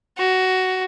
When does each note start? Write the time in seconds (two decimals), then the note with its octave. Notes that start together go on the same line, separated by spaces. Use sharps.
0.18 F#4